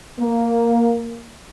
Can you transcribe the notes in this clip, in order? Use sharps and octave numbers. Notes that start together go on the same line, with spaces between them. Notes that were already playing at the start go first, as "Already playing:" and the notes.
A#3